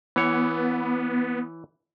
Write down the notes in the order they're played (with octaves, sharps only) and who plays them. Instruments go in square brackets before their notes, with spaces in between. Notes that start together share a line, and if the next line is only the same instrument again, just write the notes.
[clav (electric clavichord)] E3 C#5 [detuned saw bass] B3